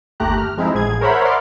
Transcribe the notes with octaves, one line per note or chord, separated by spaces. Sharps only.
G1 D#2 A3 G4 A#5 F#6
F6
F3 G#3 C4 D#4 E4
A1 G#4 G#6
A#4 C5 C#5 E5 F#5 B5
D5 C6 D6 F6